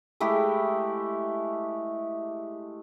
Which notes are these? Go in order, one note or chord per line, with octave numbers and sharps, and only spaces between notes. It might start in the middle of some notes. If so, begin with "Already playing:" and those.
G#3 A3 E4 G4